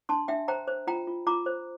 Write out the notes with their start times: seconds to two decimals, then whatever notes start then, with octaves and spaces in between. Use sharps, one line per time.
0.09 D4 A5 C6
0.28 D4 E5 G5
0.48 C5 G5 A#5
0.68 C5
0.87 F4 G5 A#5
1.07 F4
1.26 F4 A#5 D6
1.46 C5